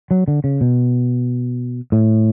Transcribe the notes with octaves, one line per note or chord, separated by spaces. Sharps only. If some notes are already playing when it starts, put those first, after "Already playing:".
F#3
D3
C#3
B2
A2